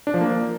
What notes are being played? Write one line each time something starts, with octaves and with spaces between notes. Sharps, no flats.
D4
F3
A#3